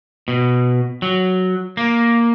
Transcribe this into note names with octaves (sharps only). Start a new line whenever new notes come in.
B2
F#3
A#3